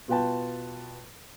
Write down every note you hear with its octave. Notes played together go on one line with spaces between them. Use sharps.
B2 F4 B4 G5 A5